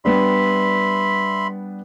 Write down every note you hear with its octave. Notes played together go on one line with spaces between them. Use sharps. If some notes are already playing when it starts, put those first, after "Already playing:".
G3 B3 D4 E5 B5 C6